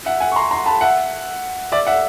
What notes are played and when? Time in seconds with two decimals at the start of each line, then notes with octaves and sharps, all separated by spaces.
0.06 E5 F#5
0.20 F#5 G#5
0.32 C#6
0.36 A#5 C6
0.51 A#5 C6
0.66 A5 B5
0.81 E5 F#5
1.72 D5 E5
1.87 E5 F#5